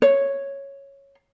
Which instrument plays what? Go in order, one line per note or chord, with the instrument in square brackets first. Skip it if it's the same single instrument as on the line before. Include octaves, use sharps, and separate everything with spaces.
[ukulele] C#5